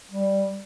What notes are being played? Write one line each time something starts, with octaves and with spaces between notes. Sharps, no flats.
G3